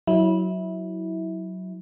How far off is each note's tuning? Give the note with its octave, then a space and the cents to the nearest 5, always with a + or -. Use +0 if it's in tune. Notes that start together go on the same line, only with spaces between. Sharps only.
F#3 +5 E4 -20